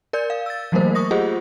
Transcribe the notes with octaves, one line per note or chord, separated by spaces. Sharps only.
A#4 D5 G6
F5
E6 A6
E3 F#3 A3 A#3 A#4 C5
C#6 D#6 A#6
F4 G4 G#4 C5 D#5 F#5